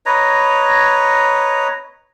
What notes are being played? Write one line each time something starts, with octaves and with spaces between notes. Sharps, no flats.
B4 C#5 D#5 A#5